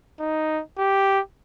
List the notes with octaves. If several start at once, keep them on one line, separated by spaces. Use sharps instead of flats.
D#4
G4